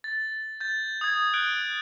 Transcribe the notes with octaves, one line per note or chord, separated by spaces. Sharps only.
A6
G6 A6
D#6 G#6
F#6 G6 D7 G7